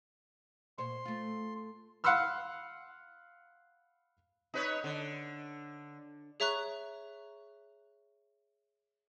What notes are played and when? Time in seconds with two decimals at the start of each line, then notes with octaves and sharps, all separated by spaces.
0.78 A#2 C5 C#5 C6
1.05 A3 F4
2.04 F5 F#5 B5 C6 E6 F6
4.54 D#4 B4 C#5
4.84 D3
6.40 G#4 C#5 E5 A#5 C#6 F#6